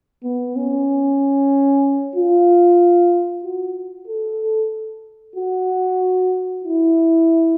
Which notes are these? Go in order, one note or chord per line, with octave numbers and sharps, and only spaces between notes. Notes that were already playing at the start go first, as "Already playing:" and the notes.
B3
C#4
F4
F#4
A4
F#4
E4